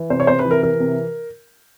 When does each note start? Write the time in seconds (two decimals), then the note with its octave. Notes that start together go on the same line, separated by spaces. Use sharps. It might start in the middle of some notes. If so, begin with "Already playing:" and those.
Already playing: E3
0.10 C3 C5
0.20 C#5
0.27 C3 C5
0.39 B4
0.45 E3
0.51 A#4
0.63 E3 A#4
0.80 C3